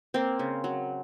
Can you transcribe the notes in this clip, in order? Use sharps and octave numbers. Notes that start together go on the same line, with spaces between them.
A#3 C4
C#3
F#3